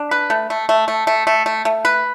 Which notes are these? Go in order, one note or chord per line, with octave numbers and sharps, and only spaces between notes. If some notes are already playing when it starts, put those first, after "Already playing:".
Already playing: D4
B4
A3
A3
A3
A3
A3
A3
A3
A3
B4